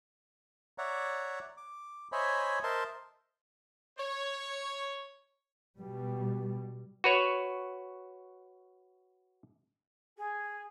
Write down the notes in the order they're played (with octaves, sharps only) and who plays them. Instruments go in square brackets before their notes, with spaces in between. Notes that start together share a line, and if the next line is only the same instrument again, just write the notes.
[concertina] C#5 D5 E5 F#5 A#5
D6
C5 C#5 D#5 E5 G#5 B5
A#4 C5 D#5 E5 A5 C6
[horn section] C#5
[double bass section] B2 G3
[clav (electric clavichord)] F#4 B4 C#5
[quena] G#4